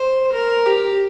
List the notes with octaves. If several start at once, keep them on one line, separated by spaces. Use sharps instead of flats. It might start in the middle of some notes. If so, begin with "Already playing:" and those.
Already playing: C5
A#4
G4